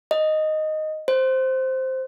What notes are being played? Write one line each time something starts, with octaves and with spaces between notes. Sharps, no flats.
D#5
C5